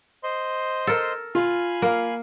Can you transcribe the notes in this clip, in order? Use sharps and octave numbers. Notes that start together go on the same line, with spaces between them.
C5 D#5 C6
A4 A#4
F4 F5 G#5 B5
A#3